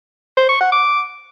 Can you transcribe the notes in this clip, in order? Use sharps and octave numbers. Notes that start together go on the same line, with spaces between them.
C5
C#6
F#5
D6